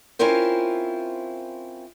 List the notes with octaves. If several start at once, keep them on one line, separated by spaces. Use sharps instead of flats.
C4 C#4 E4 F4 A#4 C5